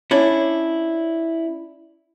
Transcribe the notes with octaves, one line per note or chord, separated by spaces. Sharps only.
C#4 D4 E4